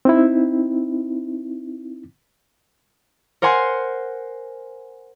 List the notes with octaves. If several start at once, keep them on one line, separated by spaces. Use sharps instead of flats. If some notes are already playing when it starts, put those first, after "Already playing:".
C4 D#4 E4
A#4 C5 F#5 G#5 C6